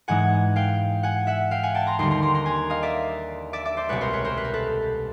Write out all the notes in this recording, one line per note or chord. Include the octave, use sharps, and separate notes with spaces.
G#2 E3 G#3 F#5 G#5
F5 G5
F#5 G#5
E5 F#5
F5 G5
F#5 G#5
G5 A5
A#5 C6
D#2 D3 G3 A#5 C6
A#5 C6
A#5 C6
A#5 C6
G#5 A#5
D#5 F5
D5 E5
D5 E5
D5 E5
C5 D5
C2 B2 G#3 B4 C#5
A#4 C5
B4 C#5
A#4 C5
B4
A#4
A4 B4